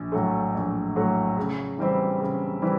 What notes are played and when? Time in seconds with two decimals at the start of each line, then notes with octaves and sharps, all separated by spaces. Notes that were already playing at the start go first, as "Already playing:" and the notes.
Already playing: A#1
0.12 A2 F#3 A3
0.54 A#1
0.95 A2 F#3 A3
1.37 C#3
1.78 E3 G3 C4 E4
2.20 C#3
2.62 E3 G3 C4 E4